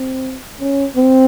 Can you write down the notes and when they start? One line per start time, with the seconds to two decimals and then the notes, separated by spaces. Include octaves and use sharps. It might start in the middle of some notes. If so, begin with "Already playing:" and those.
Already playing: C4
0.60 C#4
0.96 C4